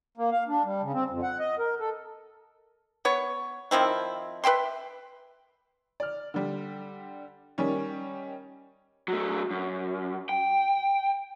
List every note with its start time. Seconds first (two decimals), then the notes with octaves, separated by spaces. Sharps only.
0.17 A#3
0.32 F5
0.48 D4
0.64 G3
0.82 C#3
0.93 C4
1.10 F2
1.23 F#5
1.39 D#5
1.59 A#4
1.80 A4
3.05 B3 C#5
3.71 D#3 F3 C4 E4
4.44 B4 E5 G5 C6
6.00 D5 F6
6.34 D3 G3
7.58 D#3 G3 C#4
9.08 F#3 A3
9.51 F#2
10.29 G5